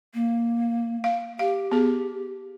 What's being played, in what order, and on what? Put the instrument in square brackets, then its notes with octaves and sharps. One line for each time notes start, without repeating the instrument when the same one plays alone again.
[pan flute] A#3
[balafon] F5
[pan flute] G4 [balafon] F5
[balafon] B3 G#4